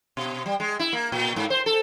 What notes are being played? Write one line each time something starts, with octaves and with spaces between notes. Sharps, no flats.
B2
G3
G#3
E4
A#3
A#2
G#2
C5
A4